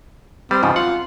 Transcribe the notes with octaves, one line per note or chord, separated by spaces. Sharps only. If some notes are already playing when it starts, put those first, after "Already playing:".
G3 C4
G#2 C#3 F3
F4 F#5